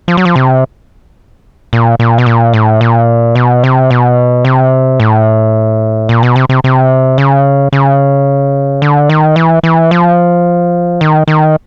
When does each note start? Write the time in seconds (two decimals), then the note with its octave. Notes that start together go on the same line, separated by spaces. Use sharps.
0.08 F3
0.17 F#3
0.25 F3
0.36 C3
1.73 A#2
1.99 A#2
2.18 B2
2.26 A#2
2.54 A2
2.81 A#2
3.35 B2
3.64 C3
3.90 B2
4.45 C3
5.00 A2
6.09 A#2
6.23 B2
6.36 C3
6.49 C3
6.64 C3
7.18 C#3
7.73 C#3
8.82 D3
9.09 D#3
9.36 E3
9.63 E3
9.91 F3
11.01 D#3
11.28 D#3